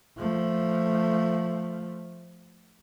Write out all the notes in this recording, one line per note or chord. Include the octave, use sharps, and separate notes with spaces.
F3 A3